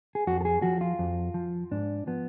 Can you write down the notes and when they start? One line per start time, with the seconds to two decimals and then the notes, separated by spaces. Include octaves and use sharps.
0.15 G#4
0.27 F2 F#4
0.41 A4
0.45 G#4
0.62 F3 F#4
0.81 F4
0.99 F2
1.34 F3
1.71 G#2 D4
2.07 F3 B3